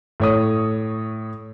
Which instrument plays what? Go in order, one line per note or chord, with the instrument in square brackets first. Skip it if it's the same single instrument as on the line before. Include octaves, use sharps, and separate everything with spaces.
[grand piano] A2 C#5 D#6